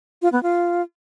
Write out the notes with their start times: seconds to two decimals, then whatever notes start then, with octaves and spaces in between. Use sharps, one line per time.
0.22 F4
0.32 B3
0.43 F4